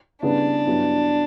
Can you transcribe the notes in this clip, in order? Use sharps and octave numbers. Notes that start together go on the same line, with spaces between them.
C#3 G3 B3 D4 E4 B4
G2 F#3 B3 E4